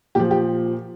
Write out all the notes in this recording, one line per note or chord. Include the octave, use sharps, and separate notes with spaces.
A#2 F3 G4
G4